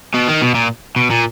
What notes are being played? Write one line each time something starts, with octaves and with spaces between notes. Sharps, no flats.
B2
D#3
B2
A#2
B2
A#2